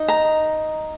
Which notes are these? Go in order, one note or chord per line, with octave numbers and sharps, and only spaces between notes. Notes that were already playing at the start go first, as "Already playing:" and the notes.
Already playing: D#4 D#5
A#5